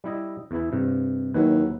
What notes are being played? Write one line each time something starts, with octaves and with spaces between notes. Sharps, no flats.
G3 E4 D#5
E2 E3 E4
G2 C3
D#2 F#3 E4 B4